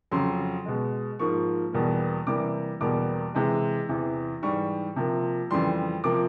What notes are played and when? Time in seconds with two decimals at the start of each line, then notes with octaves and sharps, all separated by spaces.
0.11 F2 C#3 F#3 C6
0.65 B2 G#3
1.19 G#2 F3 A#3 C#6
1.73 E2 B2 G3 A#3
2.27 C3 E3 G3 A#3 D6
2.80 E2 B2 G3 A#3 D6
3.35 C3 E3 G#3
3.89 E2 C3 E3
4.42 G#2 E3 G3 C#6
4.96 C3 F3 A#3
5.50 F2 C#3 E3 G3 C6
6.04 C3 F3 A#3 D6